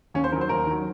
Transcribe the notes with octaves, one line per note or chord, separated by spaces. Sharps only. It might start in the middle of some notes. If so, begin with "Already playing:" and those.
D#2 C#4
C5
D#3 F#3 A#4
C5
D#2 A#4
D#3 F#3